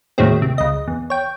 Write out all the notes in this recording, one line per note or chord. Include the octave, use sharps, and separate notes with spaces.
D#2 A2 F#3 G#3 C4
C3
C#2 D#5
E2
C#5 G5